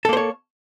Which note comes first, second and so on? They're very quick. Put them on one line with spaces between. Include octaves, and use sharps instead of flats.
A4 A#3 C5 C#5